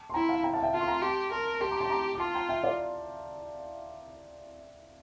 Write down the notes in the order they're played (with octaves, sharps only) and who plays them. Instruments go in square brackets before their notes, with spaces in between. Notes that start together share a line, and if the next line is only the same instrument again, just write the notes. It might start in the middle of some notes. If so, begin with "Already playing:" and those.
Already playing: [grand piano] A5
C6
[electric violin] E4 [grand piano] G5 A#5
[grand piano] F5 A5
G5 A#5
F5 A5
E5 G5
[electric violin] F4 [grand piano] F5 A5
[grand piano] C6
G5 A#5
[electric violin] G4 [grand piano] A5 C6
[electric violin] A#4 [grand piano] A5 C6
[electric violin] G4 [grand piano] A5 C6
[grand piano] A#5 D6
A5 C6
A#5 D6
D6
[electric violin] F4 [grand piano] A5 C6
[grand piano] G5 A#5
E5 G5
D5 F5